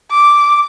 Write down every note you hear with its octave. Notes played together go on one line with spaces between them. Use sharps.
D6